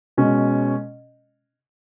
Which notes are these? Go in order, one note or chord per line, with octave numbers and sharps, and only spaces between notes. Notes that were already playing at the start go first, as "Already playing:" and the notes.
B2 G#3 C#4